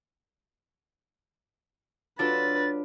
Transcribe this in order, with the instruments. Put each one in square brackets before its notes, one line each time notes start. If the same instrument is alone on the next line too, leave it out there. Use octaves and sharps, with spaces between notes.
[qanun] F#3 F4 [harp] D4 A4 [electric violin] B4 [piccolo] A6